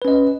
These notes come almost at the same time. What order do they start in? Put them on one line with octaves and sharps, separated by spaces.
B4 C#4 D#5